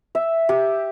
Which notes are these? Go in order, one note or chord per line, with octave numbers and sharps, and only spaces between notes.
E5
G4